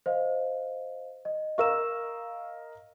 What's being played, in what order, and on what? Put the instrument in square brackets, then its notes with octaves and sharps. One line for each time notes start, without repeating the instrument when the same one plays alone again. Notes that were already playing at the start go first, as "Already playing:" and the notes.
[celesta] C5 D#5 F5
D#5
[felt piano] A#4 D#5 F5 [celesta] C#6 E6 E7